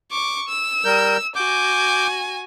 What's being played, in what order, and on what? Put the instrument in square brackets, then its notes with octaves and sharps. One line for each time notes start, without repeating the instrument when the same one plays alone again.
[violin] C#6 D6
E6
[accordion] G3 A#4 G6
[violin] F#4 G#5 [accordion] D6 G6